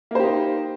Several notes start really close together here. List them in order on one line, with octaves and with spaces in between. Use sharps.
A#3 C5 G4 D#4